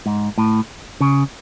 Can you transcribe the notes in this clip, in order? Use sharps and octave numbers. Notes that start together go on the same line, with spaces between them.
G#2
A2
C#3